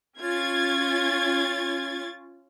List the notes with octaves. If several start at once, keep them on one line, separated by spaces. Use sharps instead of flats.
C#4 F4 G#6 A6